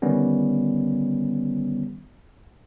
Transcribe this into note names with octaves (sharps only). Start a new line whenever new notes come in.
D3 D#3 G3 B3 C#4